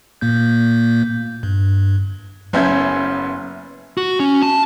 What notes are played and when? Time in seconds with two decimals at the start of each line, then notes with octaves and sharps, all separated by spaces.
0.21 A#2 A#3 G6
1.43 G2
2.53 F#1 B3 C#4 E5 G6 G#6
3.97 F#4
4.20 C#4
4.42 A5